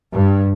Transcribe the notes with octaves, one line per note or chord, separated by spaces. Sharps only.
G2